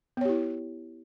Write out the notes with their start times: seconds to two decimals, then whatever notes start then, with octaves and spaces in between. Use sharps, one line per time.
0.17 B3
0.21 C#5
0.25 G4
0.29 E4